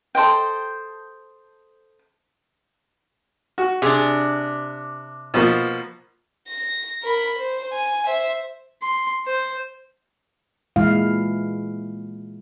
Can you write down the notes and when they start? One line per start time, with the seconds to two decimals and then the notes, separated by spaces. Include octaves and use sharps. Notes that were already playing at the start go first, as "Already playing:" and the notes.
0.15 A4 C5 D#5 G5
3.58 F#4
3.82 C3 D4 G#4
5.34 B2 F3 A#3
6.48 A#6
7.02 A#4 B5
7.39 C5
7.72 G#5
8.06 C5 E5
8.82 C6
9.26 C5
10.76 A#2 E3 G#3 E4 F5